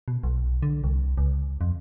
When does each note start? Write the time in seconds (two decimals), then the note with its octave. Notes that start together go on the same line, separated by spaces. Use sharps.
0.08 B2
0.23 B1
0.62 D3
0.84 C2
1.18 C#2
1.61 F2